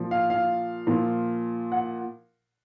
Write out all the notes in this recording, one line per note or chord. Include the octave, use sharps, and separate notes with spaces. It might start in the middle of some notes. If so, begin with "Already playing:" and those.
Already playing: A#2 F3
F5
F5
A#2 F3
F#5